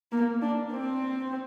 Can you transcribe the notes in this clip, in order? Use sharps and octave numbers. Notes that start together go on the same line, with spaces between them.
A#3
D4
C4